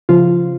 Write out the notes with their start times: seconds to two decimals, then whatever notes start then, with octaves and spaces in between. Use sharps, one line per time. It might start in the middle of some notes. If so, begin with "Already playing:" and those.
0.09 C#3 F3 F4